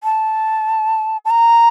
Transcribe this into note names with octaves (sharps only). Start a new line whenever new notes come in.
A5
A5
A#5